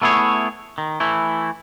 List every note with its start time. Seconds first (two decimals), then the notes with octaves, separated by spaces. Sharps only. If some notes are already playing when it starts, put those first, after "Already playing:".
0.02 A3 B3 E4 G#4 C#5
0.78 D#3
1.00 E3 A3 E4